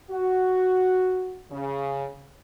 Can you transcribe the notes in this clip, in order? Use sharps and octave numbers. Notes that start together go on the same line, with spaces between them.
F#4
C#3